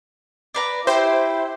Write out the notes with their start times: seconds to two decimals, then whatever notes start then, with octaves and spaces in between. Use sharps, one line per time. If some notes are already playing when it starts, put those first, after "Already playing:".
0.54 D4 B4 A#5
0.87 E4 G4 C5